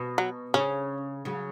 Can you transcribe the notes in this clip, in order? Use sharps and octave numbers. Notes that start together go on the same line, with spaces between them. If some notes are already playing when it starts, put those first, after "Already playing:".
Already playing: B2
F#3
C#3 C#4
C#3 F#3